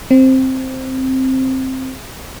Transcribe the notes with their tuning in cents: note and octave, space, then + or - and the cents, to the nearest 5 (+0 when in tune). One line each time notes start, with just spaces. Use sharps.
C4 +5